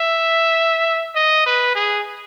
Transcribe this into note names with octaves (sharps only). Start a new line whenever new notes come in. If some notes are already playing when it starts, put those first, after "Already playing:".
Already playing: E5
D#5
B4
G#4